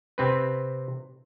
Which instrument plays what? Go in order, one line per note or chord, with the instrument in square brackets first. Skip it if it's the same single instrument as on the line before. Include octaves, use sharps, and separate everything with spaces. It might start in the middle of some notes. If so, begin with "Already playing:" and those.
[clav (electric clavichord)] C3 C4 B4